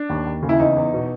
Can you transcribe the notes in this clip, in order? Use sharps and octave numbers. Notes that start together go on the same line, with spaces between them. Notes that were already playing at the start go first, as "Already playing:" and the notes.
Already playing: D4
D#2
D#2
C#3
E4
E2 D#4
E2
B2